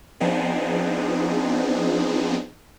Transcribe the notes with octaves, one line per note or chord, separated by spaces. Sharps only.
F3 B3 C4 D4 D#4 G#4